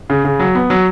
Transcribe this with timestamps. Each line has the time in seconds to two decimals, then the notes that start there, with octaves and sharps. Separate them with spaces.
0.10 C#3
0.25 C#3
0.39 F#3
0.55 B3
0.70 F#3